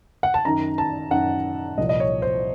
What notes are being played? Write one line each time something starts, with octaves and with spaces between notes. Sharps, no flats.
F#5
A5
F#2 D#3 A#5
A5
F#2 D#3 F#5
C2 A#2 F3 D#5
D#5
C#5
C5